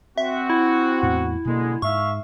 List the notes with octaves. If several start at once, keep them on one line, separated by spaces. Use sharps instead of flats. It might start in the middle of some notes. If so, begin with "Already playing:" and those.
C4 F#4 E5
E4
E2 A2
F#1 B2 D3 G#3 A#3
G#2 E5 F5 C#6